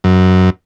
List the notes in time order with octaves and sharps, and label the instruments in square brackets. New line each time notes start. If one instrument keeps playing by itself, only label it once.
[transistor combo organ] F#2